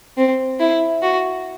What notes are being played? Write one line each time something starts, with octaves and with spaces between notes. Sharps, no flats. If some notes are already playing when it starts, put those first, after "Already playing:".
C4
E4
F#4